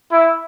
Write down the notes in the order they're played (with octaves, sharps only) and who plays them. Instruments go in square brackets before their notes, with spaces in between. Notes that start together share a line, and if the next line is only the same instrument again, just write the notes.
[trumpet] E4